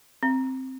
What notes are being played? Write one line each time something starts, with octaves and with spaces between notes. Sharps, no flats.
C4